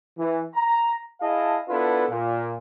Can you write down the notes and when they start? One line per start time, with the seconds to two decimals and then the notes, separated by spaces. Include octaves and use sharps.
0.17 E3
0.55 A#5
1.21 E4 G#4 D#5 F5 A5
1.69 B3 D4 E4 F4 A4 B4
2.09 A#2